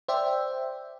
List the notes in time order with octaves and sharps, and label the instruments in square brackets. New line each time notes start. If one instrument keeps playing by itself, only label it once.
[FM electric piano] C5 D5 E5 G5